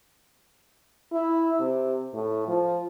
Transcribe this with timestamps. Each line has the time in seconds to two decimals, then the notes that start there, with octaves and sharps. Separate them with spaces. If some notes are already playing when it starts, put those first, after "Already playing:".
1.13 E4
1.60 C3
2.14 A2
2.48 F3